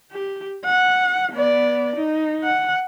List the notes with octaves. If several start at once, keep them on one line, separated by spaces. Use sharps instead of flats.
G4
F#5
B3 D5
D#4
F#5